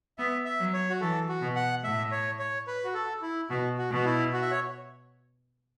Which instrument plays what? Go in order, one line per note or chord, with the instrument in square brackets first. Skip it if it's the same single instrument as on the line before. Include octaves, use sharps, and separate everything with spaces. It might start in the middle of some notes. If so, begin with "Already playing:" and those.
[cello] B3 [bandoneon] E5
[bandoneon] E5
[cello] F#3
[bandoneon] C#5
F#4
[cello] E3 [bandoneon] A4
[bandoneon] F#4
[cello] B2
[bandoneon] F#5
[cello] A2 [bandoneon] E5
[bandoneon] C#5
C#5
B4
F#4
A4
E4
[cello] B2 [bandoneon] F#4
[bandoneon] F#4
[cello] B2 [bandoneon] F#4
[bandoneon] E4
F#4
E5
C#5